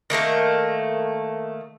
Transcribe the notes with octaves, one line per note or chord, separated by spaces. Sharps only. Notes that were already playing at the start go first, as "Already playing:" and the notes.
D#3 A3 A#3 A#4